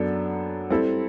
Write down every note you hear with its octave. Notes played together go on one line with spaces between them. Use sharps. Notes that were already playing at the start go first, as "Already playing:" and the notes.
Already playing: F#2 F#3 B3 D4 A4
G3 C4 E4 A4